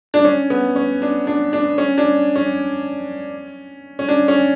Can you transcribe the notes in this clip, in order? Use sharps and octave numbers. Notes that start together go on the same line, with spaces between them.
D4
C#4
B3
C#4
D4
D4
D4
C#4
D4
C#4
C#4
D4
C#4